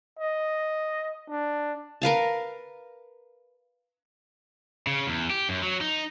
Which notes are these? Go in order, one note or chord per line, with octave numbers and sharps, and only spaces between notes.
D#5
D4
A#4 B4 F5 A5
C#3
E2
G4
F#2
F#3
D#4